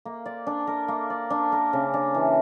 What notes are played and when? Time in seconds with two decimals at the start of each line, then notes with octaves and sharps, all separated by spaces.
0.05 A#3
0.26 D5
0.47 D4
0.67 A#4
0.88 A#3
1.10 D5
1.30 D4
1.52 A#4
1.73 C#3
1.94 D4
2.14 E3